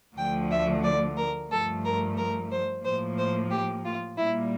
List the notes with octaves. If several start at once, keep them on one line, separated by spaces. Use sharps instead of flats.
D2 D3 F3 A3 G5
E5
D5
A#4
G2 F3 A3 A4
A#4
A#4
C5
A2 F3 A#3 C5
C5
G4
F4
A#2 G3 A#3 E4